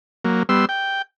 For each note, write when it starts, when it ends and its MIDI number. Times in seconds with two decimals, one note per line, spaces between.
0.25 0.43 54
0.25 0.43 58
0.49 0.65 55
0.49 0.65 59
0.49 0.65 84
0.49 0.65 88
0.69 1.02 79